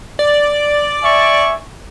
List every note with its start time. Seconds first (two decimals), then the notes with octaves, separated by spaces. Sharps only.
0.19 D5
1.01 E5 G#5 C#6